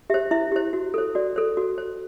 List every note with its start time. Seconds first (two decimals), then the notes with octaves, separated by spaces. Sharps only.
0.10 G4 C5 E5
0.31 E4 E5
0.52 G4 C5
0.73 F#4
0.94 A4 C5
1.15 F#4 D5
1.36 A4 C5
1.57 F#4
1.78 C5